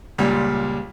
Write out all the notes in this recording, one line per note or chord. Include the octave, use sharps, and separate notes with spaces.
C#2 A#2 G3